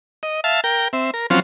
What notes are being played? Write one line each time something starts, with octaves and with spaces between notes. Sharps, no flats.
D#5
E5 F5 A5
A#4 G5
C4 E5
A#4
F3 F#3 C4 C#4 F4